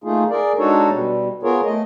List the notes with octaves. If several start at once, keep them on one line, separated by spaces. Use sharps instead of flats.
A3 A#3 D#4 F4 G#4
G#4 A#4 D5
G#3 D4 D#4 F#4 A4 C#5
B2 G3
B3 F4 G#4 A#4 C#5
A3 D#5